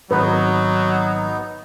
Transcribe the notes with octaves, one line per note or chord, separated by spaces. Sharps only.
G#1 F#3 B3 D#4 B4